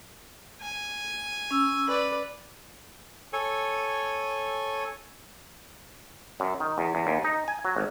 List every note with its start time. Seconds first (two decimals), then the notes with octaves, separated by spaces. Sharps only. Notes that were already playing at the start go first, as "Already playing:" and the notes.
0.61 G#5
1.51 C#4 E6
1.88 B4 D5
3.33 A4 C#5 G#5
6.40 F#2
6.60 D#3
6.78 E2
6.95 E2
7.07 D#2
7.25 D#4
7.48 G#5
7.65 F#3
7.76 G#1